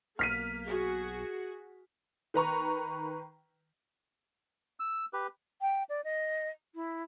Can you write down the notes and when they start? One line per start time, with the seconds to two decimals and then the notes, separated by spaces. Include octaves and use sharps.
0.19 B1 A#3 F6 B6 D#7
0.66 F#4 G#4
2.34 D#3 B4 A#5 C#6
4.80 E6
5.13 G4 B4
5.61 G5
5.89 D5
6.04 D#5
6.75 E4